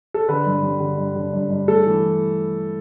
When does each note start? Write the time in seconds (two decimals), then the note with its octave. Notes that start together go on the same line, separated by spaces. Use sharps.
0.14 A4
0.28 D3 B4
0.46 G2
0.63 G3
0.80 D3
0.98 G2
1.16 D3
1.33 G2
1.50 G2
1.68 A3 A4
1.86 E3